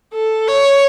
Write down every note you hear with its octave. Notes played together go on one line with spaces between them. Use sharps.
A4
C#5